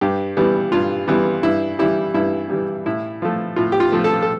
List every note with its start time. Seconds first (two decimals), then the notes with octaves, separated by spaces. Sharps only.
0.01 G2 G4
0.37 E3 G3 B3
0.72 G2 F4
1.08 E3 G3 B3
1.43 G2 E4
1.79 E3 G3 E4
2.14 G2 E4
2.50 E3 G3
2.86 A2 E4
3.22 F3 A3
3.56 A2 F4
3.72 G4
3.80 F4
3.92 F3 A3
4.04 A4
4.22 A4